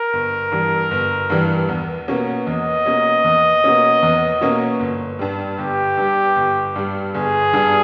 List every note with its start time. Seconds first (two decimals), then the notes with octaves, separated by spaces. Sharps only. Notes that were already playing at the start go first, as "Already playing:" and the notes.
Already playing: A#4
0.13 G1
0.52 G2 E3 G3
0.91 G1
1.30 G2 E3 G3
1.69 E2
2.08 B2 A#3 C#4
2.47 E2 D#5
2.86 B2 A#3 C#4
3.24 E2
3.64 B2 A#3 C#4
4.03 E2
4.41 B2 A#3 C#4
4.80 G1
5.19 G2 G3
5.58 G1 G4
5.97 G2 G3
6.36 G1
6.76 G2 G3
7.14 G1 G#4
7.53 G2 G3